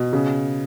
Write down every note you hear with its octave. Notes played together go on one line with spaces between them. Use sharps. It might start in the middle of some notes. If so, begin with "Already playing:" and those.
Already playing: B2
C#3